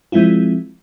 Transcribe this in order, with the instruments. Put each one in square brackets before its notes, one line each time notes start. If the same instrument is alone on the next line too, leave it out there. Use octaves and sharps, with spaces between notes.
[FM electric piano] F3 G#3 C4 E4 F4